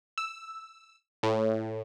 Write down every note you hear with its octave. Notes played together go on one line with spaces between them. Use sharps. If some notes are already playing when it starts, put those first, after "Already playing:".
E6
A2